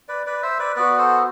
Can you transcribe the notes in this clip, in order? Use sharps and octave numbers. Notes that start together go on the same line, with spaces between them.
B4 D5
B4 D5
C5 E5
B4 D5
B3 F#4 B4 D5
A4 C5